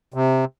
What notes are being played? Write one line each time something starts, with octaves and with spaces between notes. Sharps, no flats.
C3